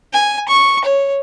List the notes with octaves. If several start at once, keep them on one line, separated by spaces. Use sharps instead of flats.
G#5
C#6
C#5